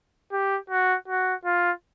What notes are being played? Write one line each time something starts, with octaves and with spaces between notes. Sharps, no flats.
G4
F#4
F#4
F4